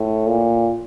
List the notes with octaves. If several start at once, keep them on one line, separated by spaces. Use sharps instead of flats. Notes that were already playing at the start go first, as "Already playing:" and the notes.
Already playing: A2
A#2